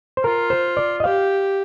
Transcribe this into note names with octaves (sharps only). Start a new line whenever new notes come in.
C5
F4 A#4
C5
D5
D#5
G4 F5